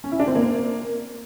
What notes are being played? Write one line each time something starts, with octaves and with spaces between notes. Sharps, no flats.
C#4
E4
D4
C4
A#3